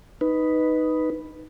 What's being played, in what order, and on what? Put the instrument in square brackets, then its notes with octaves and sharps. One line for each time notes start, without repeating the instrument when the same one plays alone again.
[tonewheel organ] D#4 B4